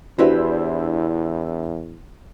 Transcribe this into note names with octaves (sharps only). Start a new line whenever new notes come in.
E2 D4 E4 F#4 G4 B4 C5